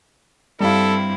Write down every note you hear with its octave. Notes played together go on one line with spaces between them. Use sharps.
G2 G3 C4 E4 A4 F5